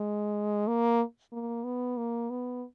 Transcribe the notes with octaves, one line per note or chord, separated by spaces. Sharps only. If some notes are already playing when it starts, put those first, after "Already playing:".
Already playing: G#3
A#3
A#3
B3
A#3
B3